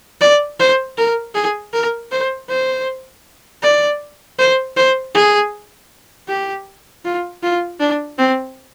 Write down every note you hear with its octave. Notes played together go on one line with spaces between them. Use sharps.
D5
C5
A#4
G#4
A#4
C5
C5
D5
C5
C5
G#4
G4
F4
F4
D4
C4